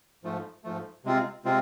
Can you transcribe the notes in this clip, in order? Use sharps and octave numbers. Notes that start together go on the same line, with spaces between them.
G#2 F3 A3
G#2 F3 A3
C3 G#3 C4 F4
C3 G#3 C4 F4